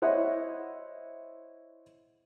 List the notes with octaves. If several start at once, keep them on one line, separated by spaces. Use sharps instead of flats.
E4 C5 C#5 D#5 E5 F#5